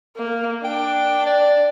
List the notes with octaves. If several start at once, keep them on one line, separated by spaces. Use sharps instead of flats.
A#3
D4 G5
D5